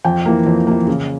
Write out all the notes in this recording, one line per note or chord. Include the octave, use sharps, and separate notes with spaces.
F2 G5
E3 A#3
F2
E3 A#3
C#3